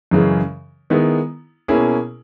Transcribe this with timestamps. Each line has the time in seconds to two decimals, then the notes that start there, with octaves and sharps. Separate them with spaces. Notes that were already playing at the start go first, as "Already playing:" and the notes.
0.11 F#2 C#3 E3 G#3
0.90 D#3 G#3 B3 E4
1.68 B2 A#3 C#4 E4 G#4